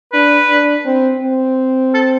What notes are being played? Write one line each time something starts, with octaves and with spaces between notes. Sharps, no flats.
D4 B4
D4
C4
C4
A4